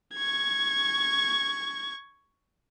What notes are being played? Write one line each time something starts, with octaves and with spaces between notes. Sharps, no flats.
C#6 G#6